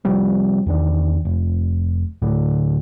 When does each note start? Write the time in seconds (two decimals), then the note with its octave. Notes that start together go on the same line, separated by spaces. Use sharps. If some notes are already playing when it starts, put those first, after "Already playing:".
0.05 C3 F3 G3 C4
0.66 E2 D#3 D4
1.25 F1
2.22 D2 A2 D3